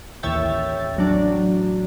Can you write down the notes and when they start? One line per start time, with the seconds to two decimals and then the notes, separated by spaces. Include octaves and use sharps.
0.23 A1 D#2 C#5 E5 G5 A6
0.97 A1 F#3 D4